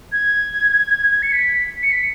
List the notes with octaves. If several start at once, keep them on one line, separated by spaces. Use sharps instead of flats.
G#6
C#7
B6
C#7
B6